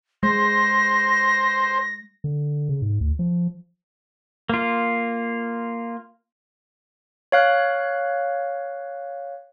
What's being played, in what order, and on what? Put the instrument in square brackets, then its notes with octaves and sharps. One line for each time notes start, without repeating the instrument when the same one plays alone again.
[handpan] G#3 [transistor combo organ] C5 [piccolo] A#6
[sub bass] D3
C#3
G#2
D2
F3
[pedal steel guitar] A#3 F4
[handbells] C#5 F5 F#6